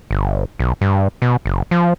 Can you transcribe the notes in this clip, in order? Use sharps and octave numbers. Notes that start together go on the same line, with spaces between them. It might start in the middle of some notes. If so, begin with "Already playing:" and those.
G1
B1
G2
B2
F#1
F3